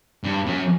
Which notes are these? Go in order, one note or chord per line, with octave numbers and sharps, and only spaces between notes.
G2
F#2